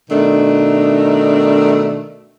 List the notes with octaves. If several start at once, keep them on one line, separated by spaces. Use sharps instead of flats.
B2 D#3 A3 D4 D#4